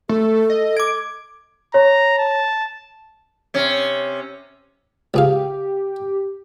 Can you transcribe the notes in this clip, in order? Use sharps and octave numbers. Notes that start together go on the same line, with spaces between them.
A3 A4
D#5
D6 G#6 D7
C#5 A#5
A5
C3 C#4
C#2 G4 G#4 F5